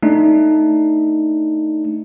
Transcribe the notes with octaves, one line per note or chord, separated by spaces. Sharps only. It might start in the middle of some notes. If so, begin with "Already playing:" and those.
A3 D4 D#4